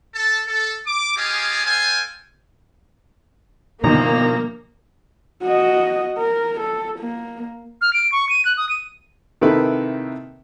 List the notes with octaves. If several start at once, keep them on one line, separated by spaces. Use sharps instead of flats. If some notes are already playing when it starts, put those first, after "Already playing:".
A4 A5
A4
D6
F4 G4 G#4 D#5 F5 G#5
A4 C5 F5 G5 G#5
G1 B2 D#3 F3 G3 A#3 A#5
F#4 D#5
A#4
A4
A#3
F6
D7
C#6
D#7
F#6
D#6
D#7
C3 D#3 A#3 E4 A4 B4